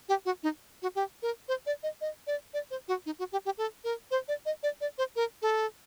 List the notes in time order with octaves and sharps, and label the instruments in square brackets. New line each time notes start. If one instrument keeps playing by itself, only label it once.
[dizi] G4
F#4
D#4
F#4
G4
A#4
C5
D5
D#5
D#5
D5
D5
C5
F#4
D#4
F#4
G4
G4
A4
A#4
C5
D5
D#5
D5
D5
C5
A#4
A4